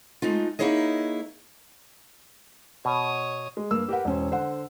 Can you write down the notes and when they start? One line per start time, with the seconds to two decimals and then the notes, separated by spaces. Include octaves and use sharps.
0.22 G#3 A3 D#4 F4
0.59 A#3 D#4 E4 G#4 C#5 D#5
2.85 B2 C#5 D#6
3.57 G#3
3.71 G2 A#3 E6
3.88 G4 A#4 B4 F#5
4.05 E1 C#4 C5
4.31 D3 C5 F#5